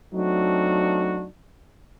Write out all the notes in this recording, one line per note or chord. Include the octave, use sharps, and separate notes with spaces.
F#3 A3 C4 D4 D#4 F#4